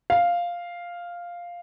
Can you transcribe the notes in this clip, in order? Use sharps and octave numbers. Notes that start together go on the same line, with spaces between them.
F5